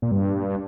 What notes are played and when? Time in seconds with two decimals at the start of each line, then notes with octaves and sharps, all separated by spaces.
0.02 A#2
0.11 G2